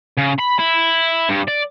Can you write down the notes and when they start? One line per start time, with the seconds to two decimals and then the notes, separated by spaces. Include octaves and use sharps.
0.17 C#3
0.38 B5
0.59 E4
1.29 G2
1.48 D5